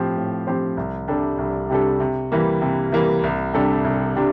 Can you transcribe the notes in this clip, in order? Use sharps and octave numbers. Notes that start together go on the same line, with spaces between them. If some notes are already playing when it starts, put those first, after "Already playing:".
Already playing: A2 F3 C4 G4 C5
A2
F3 C4 G4 C5
C2
C3 G3 D4 A4
C2
C3 G3 D4 A4
C3
E3 G3 A#3
C3
E3 G3 A#3
C2
C3 G3 D4 A4
C2
C3 G3 D4